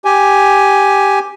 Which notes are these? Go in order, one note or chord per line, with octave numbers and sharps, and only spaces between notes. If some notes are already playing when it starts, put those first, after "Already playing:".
G4 G#5